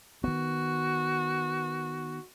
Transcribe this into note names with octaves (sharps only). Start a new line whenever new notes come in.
D#3 B3 F#4